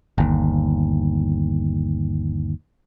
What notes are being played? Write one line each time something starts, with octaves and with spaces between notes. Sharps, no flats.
G1 D#2